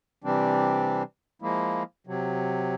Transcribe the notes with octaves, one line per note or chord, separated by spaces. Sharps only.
C3 E3 G3 C4 D4
F3 G#3 A#3 E4
C3 F#3